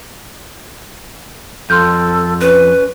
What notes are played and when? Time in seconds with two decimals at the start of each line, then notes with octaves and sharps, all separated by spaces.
1.70 F2 A4 C6 F6 G6
2.41 C#4 B4